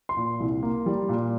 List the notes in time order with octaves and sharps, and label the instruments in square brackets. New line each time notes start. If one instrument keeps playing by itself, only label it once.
[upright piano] C6
A#2
C2
A#3
G3
A#2